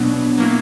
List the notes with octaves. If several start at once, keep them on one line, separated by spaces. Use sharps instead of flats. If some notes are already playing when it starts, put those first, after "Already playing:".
Already playing: B2 F#3 B3 D4
F#3 A#3 E4